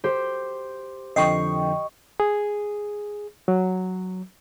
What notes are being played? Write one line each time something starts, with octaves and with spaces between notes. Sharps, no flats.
G4 C5
F2 D3 F3 D#5 G5 C#6 C7
G#4
F#3